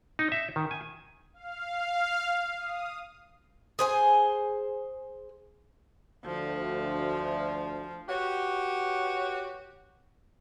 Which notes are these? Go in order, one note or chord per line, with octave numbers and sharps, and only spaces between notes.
D#4
E5
D#3
G#5
F5
D#6
G#4 C5 G#5
D2 F3
F#4 G4 B4 C#5